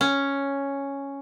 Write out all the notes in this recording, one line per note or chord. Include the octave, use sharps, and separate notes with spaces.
C#4